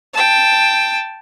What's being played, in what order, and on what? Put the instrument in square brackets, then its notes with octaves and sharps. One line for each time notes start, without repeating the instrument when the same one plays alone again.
[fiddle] G5 A5